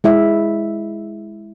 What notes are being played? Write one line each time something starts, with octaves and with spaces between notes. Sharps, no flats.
G#3 E4 E5